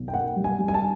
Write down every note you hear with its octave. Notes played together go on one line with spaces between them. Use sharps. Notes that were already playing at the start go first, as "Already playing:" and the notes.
Already playing: B1
G5
A#3 F#5
G3
G#5
G3
G#5
A5